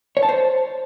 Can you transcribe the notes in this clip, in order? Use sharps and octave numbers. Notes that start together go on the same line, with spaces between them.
C#5
A5
C5